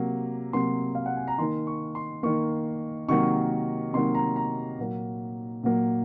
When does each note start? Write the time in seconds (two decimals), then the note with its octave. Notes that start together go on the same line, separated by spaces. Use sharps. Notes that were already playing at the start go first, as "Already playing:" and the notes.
Already playing: C3 F#3 A#3
0.53 C3 F#3 A#3 C6
0.95 F5
1.06 F#5
1.16 G#5
1.28 A#5
1.38 D#3 A#3 C6
1.67 C#6
1.95 C6
2.23 D#3 A#3 C#6
3.08 C3 D#3 F#3 A#3 C#6
3.93 C3 D#3 F#3 A#3 C6
4.15 A#5
4.36 A#5
4.78 A#2 F#3 A#3
5.63 A#2 F#3 A#3